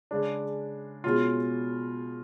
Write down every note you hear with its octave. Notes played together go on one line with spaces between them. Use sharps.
C#3 G#3 D4
B2 G#3 C#4 F4